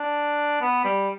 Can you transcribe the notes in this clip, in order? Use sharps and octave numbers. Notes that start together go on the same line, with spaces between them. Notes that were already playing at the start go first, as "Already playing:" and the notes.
Already playing: D4
B3
G3